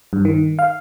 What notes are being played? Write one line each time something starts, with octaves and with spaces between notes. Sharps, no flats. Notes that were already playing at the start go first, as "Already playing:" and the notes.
G2
D#3
F5